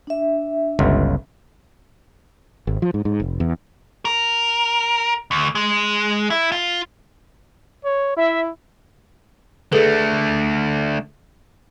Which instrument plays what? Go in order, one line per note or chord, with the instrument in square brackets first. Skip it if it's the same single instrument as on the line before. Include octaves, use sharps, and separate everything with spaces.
[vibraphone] D4 E5
[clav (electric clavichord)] G1 C#2
[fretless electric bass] G#1
F3
G#2
G#2
F1
E2
[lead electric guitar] A#4
D2
G#3
E4
F4
[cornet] C#5
[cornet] E4 [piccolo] E5
[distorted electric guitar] D3 A3 [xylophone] G#4 A4 B4